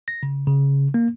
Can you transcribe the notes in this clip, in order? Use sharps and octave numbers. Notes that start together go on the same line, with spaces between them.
A#6
C#3
C#3
A#3